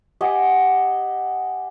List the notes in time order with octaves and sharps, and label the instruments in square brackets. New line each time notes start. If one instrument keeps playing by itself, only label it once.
[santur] G4 D#5 F#5 G#5